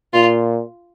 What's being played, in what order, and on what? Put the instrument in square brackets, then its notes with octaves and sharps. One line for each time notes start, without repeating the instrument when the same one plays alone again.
[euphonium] A#2 [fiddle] F4